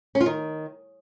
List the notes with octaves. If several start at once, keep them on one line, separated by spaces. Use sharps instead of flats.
C#4
F4
D#3